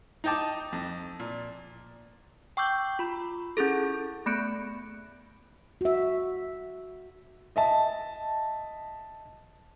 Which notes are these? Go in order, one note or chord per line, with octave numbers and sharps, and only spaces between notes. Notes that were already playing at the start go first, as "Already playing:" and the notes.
D#4 D#5 G5 A5 D6
F2
A#2
G5 C#6 D6 E6 G6
F4 B5
C#4 E4 G#4 A4
A3 B3 B5 F#6 C#7 D7
F#4 E5
D#5 E5 A5